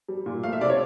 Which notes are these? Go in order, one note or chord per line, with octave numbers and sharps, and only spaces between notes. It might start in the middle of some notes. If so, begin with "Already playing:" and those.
G3
A#2
A3 F5
E5
C3 D5
C#5